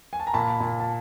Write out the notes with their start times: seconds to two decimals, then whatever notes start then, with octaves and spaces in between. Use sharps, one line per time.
0.13 G#5
0.20 A5
0.27 A#5
0.34 A#2 A5 B5
0.60 A#2
0.80 A5